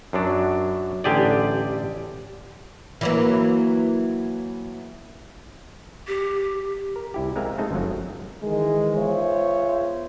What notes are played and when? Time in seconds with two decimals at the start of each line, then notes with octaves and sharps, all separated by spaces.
0.13 F#2 F#3 D4
1.04 A1 D3 G4 G#4 D5
3.01 E3 F#3 A#3
6.08 G4
6.96 A#4
7.14 C2 E4 G4
7.36 G#3 C4 A#4 E5 F5 G#5
7.58 G#3 A3 C4 D#4 A4 D#5
7.71 G1 F#2 F3 F#3
8.43 D#3 E3 G#3
8.96 B3 F4 G#4 C5 C#5 E5